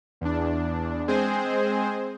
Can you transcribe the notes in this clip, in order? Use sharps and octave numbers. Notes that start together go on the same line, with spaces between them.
E2 D4
G#3 C4 G#4 C5